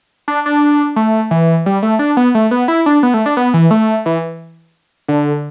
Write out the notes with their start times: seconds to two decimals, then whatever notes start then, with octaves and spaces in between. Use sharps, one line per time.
0.28 D4
0.46 D4
0.96 A3
1.31 E3
1.66 G3
1.83 A3
1.99 D4
2.17 B3
2.35 A3
2.51 B3
2.68 E4
2.86 D4
3.03 B3
3.14 A3
3.26 D4
3.37 B3
3.54 E3
3.71 A3
4.06 E3
5.08 D3